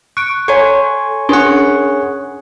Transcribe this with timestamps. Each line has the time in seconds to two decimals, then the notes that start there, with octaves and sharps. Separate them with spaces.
0.17 C#6 F#6 D7
0.48 A4 C#5 G#5 C6 C#6
1.29 C#4 D4 G#4 C#5 F#5